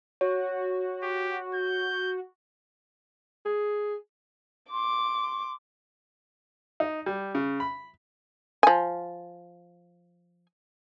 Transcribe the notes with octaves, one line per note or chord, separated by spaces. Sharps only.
F#4 C#5
G4
G6
G#4
C6 D6
D#4
G3
C#3
B5
F3 G#5